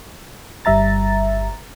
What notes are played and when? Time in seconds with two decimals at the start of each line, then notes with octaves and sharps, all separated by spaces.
0.65 G1 G3 E5 A#5 A6